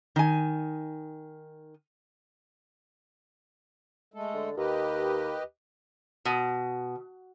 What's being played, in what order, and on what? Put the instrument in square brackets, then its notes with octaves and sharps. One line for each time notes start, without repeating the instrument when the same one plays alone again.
[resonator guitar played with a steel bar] D#3 G#5
[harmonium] G#3 A3 A4
[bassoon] D3
[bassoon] D#2 [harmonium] G4 B4 D#5
[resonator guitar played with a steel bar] B2